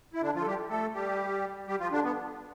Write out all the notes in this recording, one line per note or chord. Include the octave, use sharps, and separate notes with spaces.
E4
D3 D4
F3 F4
A4
G3 G4
A3 A4
G3 G4
G3 G4
F3 F4
D3 D4
B3